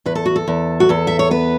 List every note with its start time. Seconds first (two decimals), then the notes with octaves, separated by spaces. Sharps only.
0.06 E2 B4
0.15 A4
0.26 F#4
0.36 A4
0.47 E2
0.80 F#4
0.89 E2 A4
1.07 E5
1.19 C#5
1.31 B3 B4